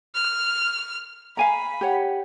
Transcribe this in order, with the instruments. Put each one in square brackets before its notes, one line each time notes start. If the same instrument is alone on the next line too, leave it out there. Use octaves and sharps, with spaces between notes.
[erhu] F6
[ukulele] F5 G#5 A#5 [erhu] B5
[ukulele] G4 C#5 F#5